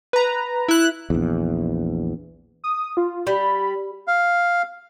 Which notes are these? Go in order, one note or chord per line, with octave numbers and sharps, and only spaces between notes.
B4 A#5
E4 F#6
A#1 E2
D#6
F4
G3 B5
F5